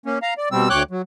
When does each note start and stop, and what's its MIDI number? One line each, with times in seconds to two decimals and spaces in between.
0.06 0.19 58
0.06 0.19 61
0.22 0.34 77
0.22 0.34 82
0.38 0.49 74
0.52 0.69 47
0.52 0.69 55
0.52 0.69 60
0.52 0.69 88
0.70 0.83 38
0.70 0.83 73
0.70 0.83 79
0.70 0.83 86
0.70 0.83 90
0.70 0.83 91
0.91 1.02 54